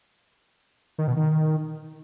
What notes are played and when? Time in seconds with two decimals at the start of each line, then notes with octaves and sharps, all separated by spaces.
0.98 D#3
1.08 B2
1.17 D#3